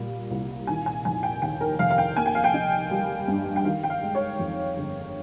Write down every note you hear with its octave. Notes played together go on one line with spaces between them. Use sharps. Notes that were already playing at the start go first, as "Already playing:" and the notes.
Already playing: A#2 G3
C2
D#3 G#5
G#5
F1 G#5
G5
D#2 G5
A#4
F1 F5
F5
G5
A#3 G#5
G5
F5
G5
D#4
G3
G2
G5
D#3 F5
G5
F5
G#3
C#5
F2
G1